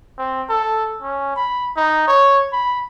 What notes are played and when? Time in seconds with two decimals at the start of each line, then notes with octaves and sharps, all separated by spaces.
0.18 C4
0.49 A4
1.02 C#4
1.36 B5
1.77 D#4
2.07 C#5
2.52 B5